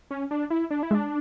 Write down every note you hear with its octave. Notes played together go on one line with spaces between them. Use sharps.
C#4
D4
E4
D4
E4
G#3
D4